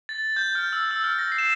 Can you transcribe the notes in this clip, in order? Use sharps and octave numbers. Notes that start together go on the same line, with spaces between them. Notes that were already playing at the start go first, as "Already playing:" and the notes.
A6
G6
F6
E6
E6
F6
A#6
C7
E7